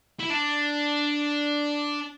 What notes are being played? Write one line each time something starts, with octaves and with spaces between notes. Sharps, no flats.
E4
D4